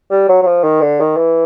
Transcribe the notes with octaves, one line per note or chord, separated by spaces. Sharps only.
G3
F#3
F#3
F3
D#3
D3
D#3
E3